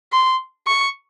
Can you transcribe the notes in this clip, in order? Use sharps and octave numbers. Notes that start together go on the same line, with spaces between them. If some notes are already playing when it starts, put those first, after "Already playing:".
C6
C#6